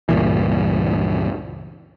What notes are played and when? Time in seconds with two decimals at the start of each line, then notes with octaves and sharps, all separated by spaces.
0.09 C#2 G2 A#2 E3